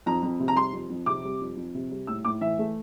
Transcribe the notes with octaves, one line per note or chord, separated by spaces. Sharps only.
F2 A#5
F2
C3
A#5
G3 C6
F2
F2
C3 D6
G3
F2
F2
C3
G3
A2 E6
A2 D6
E3 E5
A3